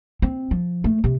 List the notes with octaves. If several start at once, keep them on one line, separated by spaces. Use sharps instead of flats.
C4
F3
A3
C3